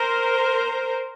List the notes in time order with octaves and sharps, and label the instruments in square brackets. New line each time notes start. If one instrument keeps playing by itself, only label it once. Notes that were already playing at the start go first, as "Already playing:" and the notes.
Already playing: [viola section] A#4 C5